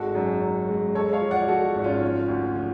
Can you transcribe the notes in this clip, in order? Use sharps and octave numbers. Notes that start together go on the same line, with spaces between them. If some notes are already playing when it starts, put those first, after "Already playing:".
Already playing: G#1 G#3 F#4 A4
F#2
F#2
G#3
G#3 A4 C#5
C#5 F5
F3
D5 F#5
F3 F#4 A4
G#1
C#4 F4
F3
D2
F3